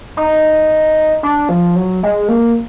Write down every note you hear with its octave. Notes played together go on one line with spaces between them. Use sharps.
D#4
D4
F3
F#3
G#3
A#3